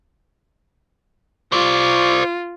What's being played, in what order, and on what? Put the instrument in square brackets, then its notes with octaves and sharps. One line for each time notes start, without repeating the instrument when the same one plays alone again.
[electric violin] F4 [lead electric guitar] C5 D5